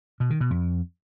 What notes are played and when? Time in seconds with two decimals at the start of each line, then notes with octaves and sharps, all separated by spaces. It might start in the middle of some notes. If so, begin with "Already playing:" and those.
0.20 B2
0.30 D#3
0.41 B2
0.51 F2